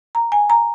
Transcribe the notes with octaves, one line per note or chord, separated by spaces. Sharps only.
A#5
G#5
A#5